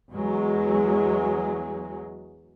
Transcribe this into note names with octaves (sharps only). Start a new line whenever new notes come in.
E2 F#3 G#3